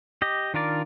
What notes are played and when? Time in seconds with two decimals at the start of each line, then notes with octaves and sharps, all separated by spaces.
0.22 G4 D#5
0.54 D#3 D4 F4 A#4 D5